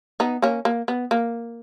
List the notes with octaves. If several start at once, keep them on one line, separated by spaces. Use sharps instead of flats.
B3 D#4
A#3 C#4
A#3
B3
A#3